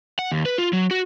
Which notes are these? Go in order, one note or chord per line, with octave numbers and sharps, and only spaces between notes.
F#5
D#2
B4
F4
F#3
F#4